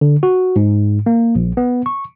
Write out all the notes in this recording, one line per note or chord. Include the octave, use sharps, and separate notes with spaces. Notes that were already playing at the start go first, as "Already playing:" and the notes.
D3
F#4
G#2
A#3
A#1
B3
C#6